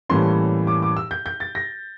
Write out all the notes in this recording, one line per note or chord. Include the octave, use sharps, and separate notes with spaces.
A2 E3 G3 A#3 C#4 C6
D6
D6
E6
G6
G6
A6
A#6